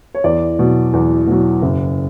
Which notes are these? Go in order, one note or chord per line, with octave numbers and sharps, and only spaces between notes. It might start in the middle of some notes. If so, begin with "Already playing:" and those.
C#5
E2 D5
B2 F#3
E2
B2 F#3
F#1